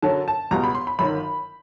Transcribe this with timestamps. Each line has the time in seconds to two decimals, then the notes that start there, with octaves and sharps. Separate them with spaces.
0.02 F#2 D3 F#3 A5
0.28 A5
0.51 C#2 B2 G3 A#5
0.64 B5
0.75 C6
0.87 B5
0.99 G1 F#2 D#3 F#3 B5